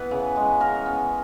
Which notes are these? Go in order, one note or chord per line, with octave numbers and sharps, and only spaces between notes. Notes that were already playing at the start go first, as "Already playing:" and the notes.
Already playing: E3 B3 B4
C#3
G#3
C#3 A#4
B3